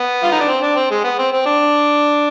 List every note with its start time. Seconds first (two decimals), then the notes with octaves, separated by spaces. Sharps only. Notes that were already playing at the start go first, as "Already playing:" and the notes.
Already playing: B3
0.23 F4
0.32 D#4
0.40 D4
0.48 C4
0.62 D4
0.76 C4
0.91 G#3
1.04 B3
1.19 C4
1.32 C4
1.46 D4